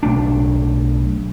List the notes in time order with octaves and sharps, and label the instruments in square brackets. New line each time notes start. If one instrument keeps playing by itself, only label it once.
[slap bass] B1 A3 D4